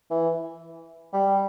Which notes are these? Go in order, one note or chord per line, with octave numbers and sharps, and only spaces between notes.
E3
G3